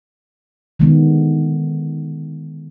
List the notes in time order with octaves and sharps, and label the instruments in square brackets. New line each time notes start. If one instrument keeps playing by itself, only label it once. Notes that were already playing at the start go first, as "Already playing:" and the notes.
[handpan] D3 D#3 G#3 B3